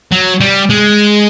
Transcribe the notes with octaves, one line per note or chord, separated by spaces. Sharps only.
F#3
G3
G#3